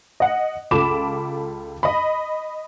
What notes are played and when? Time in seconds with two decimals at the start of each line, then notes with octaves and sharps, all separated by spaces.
0.20 D#5 F#5
0.71 C#2 F4 A4 B5 D6 E7
1.83 D#5 B5